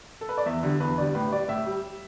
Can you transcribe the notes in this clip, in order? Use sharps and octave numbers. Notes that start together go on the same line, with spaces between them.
A4
B4
D5
E2 E5
D3 G3
E2 B4
D3 G3 D5
A2 B4
G3 D5
A2 E5
G3